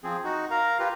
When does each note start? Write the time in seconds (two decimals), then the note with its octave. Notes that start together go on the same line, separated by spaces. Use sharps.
0.04 F3 C4 G#4
0.24 D#4 F#4
0.51 A#4 F5 A#5
0.79 F4 G4 B4